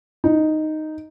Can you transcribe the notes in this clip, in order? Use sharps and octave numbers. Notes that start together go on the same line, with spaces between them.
D#4